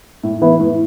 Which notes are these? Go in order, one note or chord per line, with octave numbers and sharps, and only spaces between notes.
A2
E3 B3 E4
A2